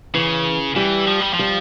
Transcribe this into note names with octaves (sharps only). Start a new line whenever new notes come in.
C#3 E3
E3 G3
F3
G3
F3
G3